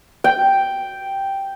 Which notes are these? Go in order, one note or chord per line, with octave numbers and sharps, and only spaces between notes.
G5